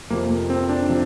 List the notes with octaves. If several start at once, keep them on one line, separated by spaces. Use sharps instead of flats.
F2 C3 F3 A#3
A#3
C4
D4
C3 F3